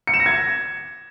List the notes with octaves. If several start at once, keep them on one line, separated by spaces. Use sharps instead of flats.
C#7
E7
A#6
G#6